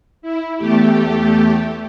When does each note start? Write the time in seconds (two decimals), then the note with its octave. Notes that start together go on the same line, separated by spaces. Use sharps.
0.22 E4
0.58 E2 A3 G4